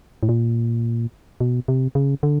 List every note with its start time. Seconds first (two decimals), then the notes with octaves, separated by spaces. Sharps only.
0.23 A2
0.29 A#2
1.40 B2
1.68 C3
1.95 C#3
2.23 D3